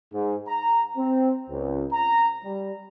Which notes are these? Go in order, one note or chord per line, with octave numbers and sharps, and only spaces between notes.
G#2
A#5
C4
C#2
A#5
G3